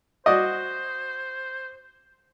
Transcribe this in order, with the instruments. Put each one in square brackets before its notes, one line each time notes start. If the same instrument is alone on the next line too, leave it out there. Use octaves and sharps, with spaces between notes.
[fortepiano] F#4 D5 D#5 [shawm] C5